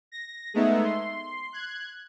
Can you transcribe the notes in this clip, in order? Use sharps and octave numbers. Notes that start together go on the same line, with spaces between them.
A#6
G#3 A3 B3 D#4 E5
C6
F#6 G#6